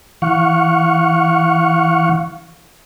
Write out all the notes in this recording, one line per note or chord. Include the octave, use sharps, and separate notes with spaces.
E3 F5 F#5 C#6